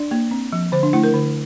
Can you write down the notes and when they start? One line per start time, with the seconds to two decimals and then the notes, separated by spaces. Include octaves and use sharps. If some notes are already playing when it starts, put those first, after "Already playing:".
Already playing: D4 D5
0.11 A#3
0.31 C4
0.53 F3
0.72 D3 C5
0.83 D4
0.93 A3 E4
1.04 A#4
1.14 D3